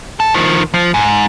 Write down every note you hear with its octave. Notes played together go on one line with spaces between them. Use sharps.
A4
D#3 F3
F3
G#2